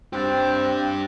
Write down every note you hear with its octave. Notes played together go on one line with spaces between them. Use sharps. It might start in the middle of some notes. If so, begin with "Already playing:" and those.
C4 D4 G4